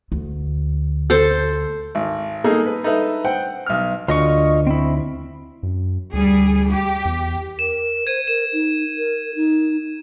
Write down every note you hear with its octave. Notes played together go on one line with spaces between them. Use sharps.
D2
A4 C5
G#1
G#3 A#3 D#4 G#4 A4
B4
D#4 A4 B4 E5
C5 F#5 G5
B1 F6
D2 F4 D#5 C#6
C4 E4
F#2
D2 G3 G#4
G4
E2
A#4 E7
C5 G#6 D#7
A#4 E7
D#4
A#4
D#4